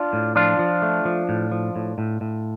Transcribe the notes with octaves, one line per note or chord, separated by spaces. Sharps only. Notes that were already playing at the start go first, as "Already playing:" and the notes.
Already playing: D4 F4
A2
F3 D4 F4
F3
A3
F3
A2
F3
A2
A2
A2